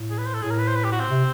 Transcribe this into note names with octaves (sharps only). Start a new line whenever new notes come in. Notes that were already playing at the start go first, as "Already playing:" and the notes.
Already playing: A2
G#4
B4
C5
A4
A2 G#4
A#4
B4
C5
B4
G4
F#4
C4
C3